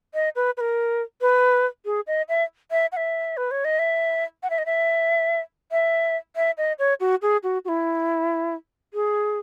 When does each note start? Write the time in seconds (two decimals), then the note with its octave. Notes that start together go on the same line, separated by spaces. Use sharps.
0.14 D#5
0.36 B4
0.57 B4
0.61 A#4
1.21 B4
1.85 G#4
2.07 D#5
2.29 E5
2.71 E5
2.92 F#5
2.97 E5
3.37 B4
3.51 C#5
3.65 D#5
3.79 E5
4.43 F#5
4.50 E5
4.58 D#5
4.66 E5
5.71 E5
6.36 E5
6.58 D#5
6.79 C#5
7.00 F#4
7.22 G#4
7.43 F#4
7.65 F#4
7.68 E4
8.94 G#4